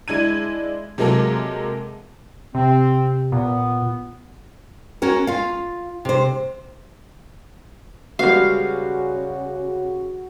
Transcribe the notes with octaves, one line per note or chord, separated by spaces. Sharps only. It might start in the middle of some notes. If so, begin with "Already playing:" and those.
G#3 D4 E4 G#6 D#7
C3 F#3 G#3 A#3 A4 A#4
C3 C4
A#2 B3
C#4 F#4 A#4
F4 F5
C3 C5
C#3 G3 G#3 B3 F#4 F5